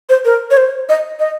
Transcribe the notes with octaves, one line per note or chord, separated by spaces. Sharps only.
C5
A#4
C#5
C5
D#5
D#5